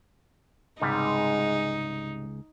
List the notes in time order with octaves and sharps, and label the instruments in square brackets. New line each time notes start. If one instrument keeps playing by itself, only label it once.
[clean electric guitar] C#2 [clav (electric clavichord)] G#2 C3 G3 [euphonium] G#3 [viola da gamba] D#4